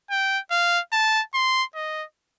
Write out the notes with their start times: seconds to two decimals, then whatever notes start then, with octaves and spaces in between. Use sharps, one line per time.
0.11 G5
0.51 F5
0.93 A5
1.34 C6
1.75 D#5